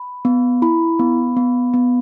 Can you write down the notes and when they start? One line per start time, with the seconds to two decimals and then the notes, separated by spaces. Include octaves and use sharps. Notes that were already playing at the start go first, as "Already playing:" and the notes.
Already playing: B5
0.25 B3
0.62 E4 B5
0.99 B3
1.37 B3
1.74 B3